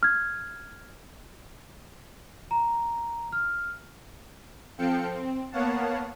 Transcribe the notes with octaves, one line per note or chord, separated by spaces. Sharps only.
F6 G#6
A#5
F6
F3 C4 A4 F5 G5 C#7
C4
A#3 B3 C#5 F5 F#5 A5